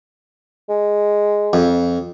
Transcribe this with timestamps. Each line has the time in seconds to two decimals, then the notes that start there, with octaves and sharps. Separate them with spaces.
0.69 G#3
1.53 F2